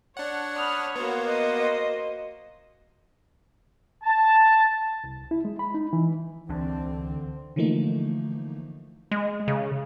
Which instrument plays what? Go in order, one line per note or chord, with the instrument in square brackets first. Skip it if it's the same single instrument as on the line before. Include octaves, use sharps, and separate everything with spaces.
[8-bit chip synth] D4 F#5 [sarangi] C#5
[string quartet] B5 D#6 F6
[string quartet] A#3 F#4 C5 [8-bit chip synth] B3
[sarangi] D#5
[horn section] A5
[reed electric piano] C2
E4
G#3
B5
D#4
E3
[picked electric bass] C#2 E3 D4 [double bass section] D3 C4
[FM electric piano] D3 E3 F3 A3 A#3 D#4
[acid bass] G#3
C#3